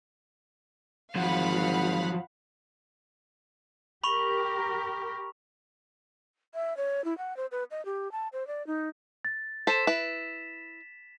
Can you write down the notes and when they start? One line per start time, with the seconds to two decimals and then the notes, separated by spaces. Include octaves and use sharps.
1.15 G#1 F3 F#3 F5 F#5 B5
4.04 G4 A#4 B5 C#6 F7
6.54 E5
6.77 C#5
7.05 E4
7.18 F#5
7.37 C5
7.51 B4
7.71 D#5
7.85 G4
8.12 A5
8.33 C5
8.47 D5
8.67 D#4
9.25 A6
9.67 A4 C5 B6 E7
9.87 E4 B4